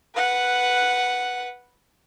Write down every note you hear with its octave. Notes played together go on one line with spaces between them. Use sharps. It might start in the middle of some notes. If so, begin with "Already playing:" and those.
B4 F#5